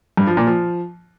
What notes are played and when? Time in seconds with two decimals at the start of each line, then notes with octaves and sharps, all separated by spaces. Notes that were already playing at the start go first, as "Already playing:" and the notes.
0.17 G2
0.27 F3
0.37 A#2
0.47 F3